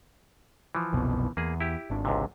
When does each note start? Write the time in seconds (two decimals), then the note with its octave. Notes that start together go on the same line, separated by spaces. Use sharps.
0.75 E3 F3
0.93 F#1 C2 B2
1.37 E2 A#3 G#4
1.60 E4 G4
1.90 G#1 D4
2.05 C#2 G#2 C3